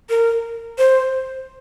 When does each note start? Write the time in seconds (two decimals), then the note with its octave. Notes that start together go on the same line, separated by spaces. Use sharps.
0.10 A#4
0.78 C5